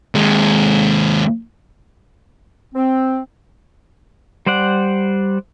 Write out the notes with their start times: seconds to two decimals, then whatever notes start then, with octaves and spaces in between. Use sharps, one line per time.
0.15 D#2 G#3
2.74 C4
4.46 G3 C5 D5 F#5